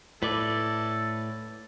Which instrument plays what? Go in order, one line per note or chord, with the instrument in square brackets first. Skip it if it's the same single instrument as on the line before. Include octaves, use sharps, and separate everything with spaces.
[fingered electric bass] A2 [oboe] A4 [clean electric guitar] B4 D5